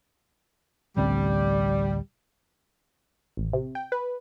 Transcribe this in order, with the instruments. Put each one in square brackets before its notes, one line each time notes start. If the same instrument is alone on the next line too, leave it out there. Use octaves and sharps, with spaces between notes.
[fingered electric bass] A1 D2 C4 [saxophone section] G3
[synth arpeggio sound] A1
C3
G5
B4